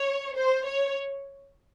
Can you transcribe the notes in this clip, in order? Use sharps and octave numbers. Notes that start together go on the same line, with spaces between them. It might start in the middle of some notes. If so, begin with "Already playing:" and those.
Already playing: C#5
C5
C#5